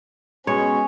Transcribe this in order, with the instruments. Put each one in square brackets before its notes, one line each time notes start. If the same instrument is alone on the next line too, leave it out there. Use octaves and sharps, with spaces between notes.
[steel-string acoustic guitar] B2 [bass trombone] G#3 [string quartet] C#4 [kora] C#5